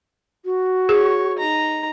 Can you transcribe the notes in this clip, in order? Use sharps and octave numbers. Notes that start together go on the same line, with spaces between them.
F#4
G#4 C#5
D#4 A#5